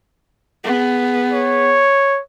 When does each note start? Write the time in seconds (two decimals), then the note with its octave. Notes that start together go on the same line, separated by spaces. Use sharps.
0.64 B3 G#4
1.33 C#5